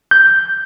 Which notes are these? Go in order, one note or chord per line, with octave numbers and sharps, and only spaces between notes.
G6